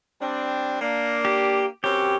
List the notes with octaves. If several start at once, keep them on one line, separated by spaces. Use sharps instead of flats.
G3 C4 D4
A#3 D4
G4
F#2 C4 G4 C#5